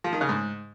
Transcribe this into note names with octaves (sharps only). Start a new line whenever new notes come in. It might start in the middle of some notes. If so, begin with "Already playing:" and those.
F3
D#3
C#3
G#2